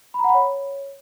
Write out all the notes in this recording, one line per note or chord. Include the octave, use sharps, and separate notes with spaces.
B5
A#5
F#5
B5
C#5